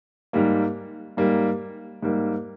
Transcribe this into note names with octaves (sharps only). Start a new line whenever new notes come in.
G#2 G3 A#3
G#2 G3 A#3
G#2 G3 A#3